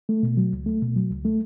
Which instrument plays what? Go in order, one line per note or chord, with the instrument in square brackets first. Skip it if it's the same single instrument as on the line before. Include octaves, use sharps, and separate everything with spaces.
[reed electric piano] A3
B2
F#3
C#2
A3
B2
F#3
C#2
A3